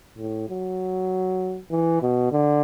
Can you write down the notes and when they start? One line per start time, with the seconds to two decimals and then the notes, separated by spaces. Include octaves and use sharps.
0.18 A2
0.49 F#3
1.71 E3
2.02 B2
2.32 D3